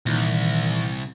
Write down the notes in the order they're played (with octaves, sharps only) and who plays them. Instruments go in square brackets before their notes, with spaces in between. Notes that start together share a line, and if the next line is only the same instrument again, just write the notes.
[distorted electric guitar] C2 [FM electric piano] A#2 D#3 E3